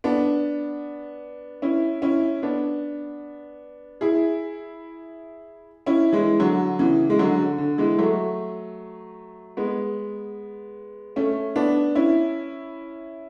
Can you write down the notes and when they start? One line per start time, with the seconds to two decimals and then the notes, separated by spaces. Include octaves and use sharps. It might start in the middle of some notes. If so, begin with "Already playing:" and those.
0.04 B3 D4
1.62 C#4 E4
2.02 C#4 E4
2.43 B3 D4
4.01 E4 G#4
5.86 C#4 E4
6.13 E3 G#3
6.40 D3 F#3
6.79 C#3 E3
7.10 G#3
7.19 D3 F#3
7.39 D3
7.58 D3
7.78 E3 G#3
7.98 F#3 A3
9.57 G#3 B3
11.16 A3 C#4
11.56 B3 D4
11.95 C#4 E4